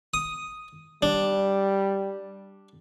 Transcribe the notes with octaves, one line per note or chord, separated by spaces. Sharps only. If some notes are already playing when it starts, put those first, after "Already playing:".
D#6
G3 D4